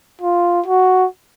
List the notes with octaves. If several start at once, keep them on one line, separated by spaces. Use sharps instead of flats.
F4
F#4